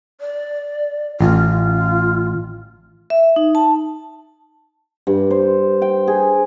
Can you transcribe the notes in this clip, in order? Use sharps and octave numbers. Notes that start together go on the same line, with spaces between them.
D5
A1 F4
E5
D#4
A5
G2
C5
G5
G#4